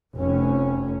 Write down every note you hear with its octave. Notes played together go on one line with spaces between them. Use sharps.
F1 C#4